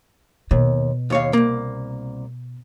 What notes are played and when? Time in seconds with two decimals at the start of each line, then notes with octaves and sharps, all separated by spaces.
0.51 D#2 B2
1.10 D#2 C#5 F5
1.33 C2 A#3